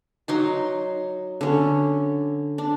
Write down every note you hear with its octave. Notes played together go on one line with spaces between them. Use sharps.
F#3 D#4 C6
D3 C#4
D4